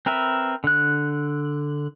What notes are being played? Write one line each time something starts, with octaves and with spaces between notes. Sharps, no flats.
C4 A#4 B4 E5
D3 F#6